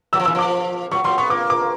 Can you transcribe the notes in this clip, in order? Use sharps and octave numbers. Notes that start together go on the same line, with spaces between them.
F#3 E6
F3
E3 E6
F3 D6
F#3 C#6
F#3 C6
B3 C#6
A#3 D6
D6